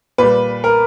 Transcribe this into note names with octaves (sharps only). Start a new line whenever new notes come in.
A#2 G3 B4
A#4